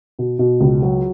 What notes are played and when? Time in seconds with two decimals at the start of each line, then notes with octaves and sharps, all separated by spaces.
0.19 B2
0.39 B2
0.60 C#2
0.82 F#3